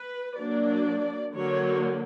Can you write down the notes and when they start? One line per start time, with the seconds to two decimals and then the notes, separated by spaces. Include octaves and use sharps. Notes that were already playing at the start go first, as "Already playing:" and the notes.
Already playing: B4
0.37 F#3 A#3 D4 D5
1.34 D3 F#3 A#3 C#5